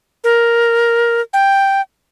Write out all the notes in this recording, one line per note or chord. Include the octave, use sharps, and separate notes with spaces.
A#4
G5